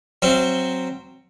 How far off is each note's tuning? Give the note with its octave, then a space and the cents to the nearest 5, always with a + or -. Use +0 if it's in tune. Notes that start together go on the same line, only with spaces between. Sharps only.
F#3 +0 C4 +0 F5 -35